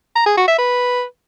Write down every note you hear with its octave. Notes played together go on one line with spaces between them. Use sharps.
A#5
G#4
F#4
E5
B4